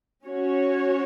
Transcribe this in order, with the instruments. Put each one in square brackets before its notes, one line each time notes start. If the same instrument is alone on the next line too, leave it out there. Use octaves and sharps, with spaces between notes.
[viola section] C#4 F#4 C#5